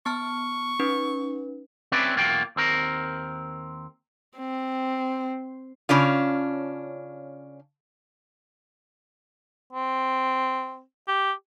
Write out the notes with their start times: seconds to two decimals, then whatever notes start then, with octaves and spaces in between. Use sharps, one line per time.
0.06 B3 A5 C#6 F6
0.80 C#4 D#4 B4
1.92 C4 C#4 E4 G4 B4 D5
2.16 B1 E2 A#3 F4 F#4 G5
2.56 D#2 C4 A#4
4.37 C4
5.89 C#3 C#4 D4 F4
9.73 C4
11.08 G4